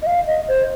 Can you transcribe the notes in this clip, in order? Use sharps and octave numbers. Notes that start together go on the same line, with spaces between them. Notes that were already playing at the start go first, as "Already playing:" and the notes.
D#5
F5
D#5
C5